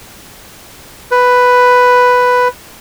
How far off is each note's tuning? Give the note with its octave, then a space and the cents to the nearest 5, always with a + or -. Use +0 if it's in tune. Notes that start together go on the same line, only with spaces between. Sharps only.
B4 +5